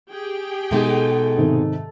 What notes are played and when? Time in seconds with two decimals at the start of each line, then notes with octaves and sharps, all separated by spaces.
0.12 G4 G#4 G5
0.71 B2 G#3 A3 D#4
1.37 G#2 C3 D#3